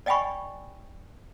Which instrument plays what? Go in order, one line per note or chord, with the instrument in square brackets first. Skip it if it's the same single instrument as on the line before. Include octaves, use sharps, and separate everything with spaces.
[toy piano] D5 D#5 G5 G#5 B5 C#6